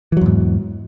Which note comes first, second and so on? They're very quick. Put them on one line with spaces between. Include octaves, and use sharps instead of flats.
E3 F#3 E2 G#2